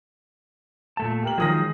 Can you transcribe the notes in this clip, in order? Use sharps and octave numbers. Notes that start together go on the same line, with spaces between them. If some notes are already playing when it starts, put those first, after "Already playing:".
A#2 A3 A5
G4 A#4 F#7
D#3 F3 F#3 G#3 D#6 A#6